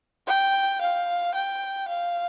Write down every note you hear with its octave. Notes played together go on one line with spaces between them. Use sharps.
G5
F5
G5
F5